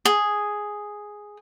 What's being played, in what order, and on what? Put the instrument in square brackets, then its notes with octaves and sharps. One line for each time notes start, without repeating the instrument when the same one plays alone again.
[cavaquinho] G#4